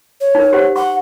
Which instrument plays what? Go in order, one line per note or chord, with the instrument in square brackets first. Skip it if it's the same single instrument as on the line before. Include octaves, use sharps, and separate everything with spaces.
[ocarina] C#5
[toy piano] D#4 A#4
G4 C5 F#5
[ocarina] F#5 [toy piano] C#6